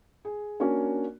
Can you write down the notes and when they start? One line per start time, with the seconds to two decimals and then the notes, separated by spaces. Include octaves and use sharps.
0.25 G#4
0.60 A#3 C#4 D4 F#4 C#5